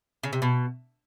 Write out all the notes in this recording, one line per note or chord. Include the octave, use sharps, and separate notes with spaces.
C#3
C3
B2